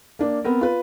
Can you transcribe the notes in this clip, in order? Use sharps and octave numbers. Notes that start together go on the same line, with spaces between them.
A#3 D4
B3 C4 A#4
F4 B4